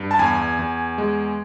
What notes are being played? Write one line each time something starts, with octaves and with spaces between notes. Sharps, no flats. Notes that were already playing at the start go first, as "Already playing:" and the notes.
Already playing: G2
A5
E2 G#5
E2
G#3